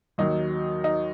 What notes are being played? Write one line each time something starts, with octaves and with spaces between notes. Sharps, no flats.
D#2 D#3 F#3 D#4
D#4